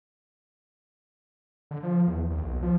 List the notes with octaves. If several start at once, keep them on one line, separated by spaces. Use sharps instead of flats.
D3
F3
E2
D#2
B1
F3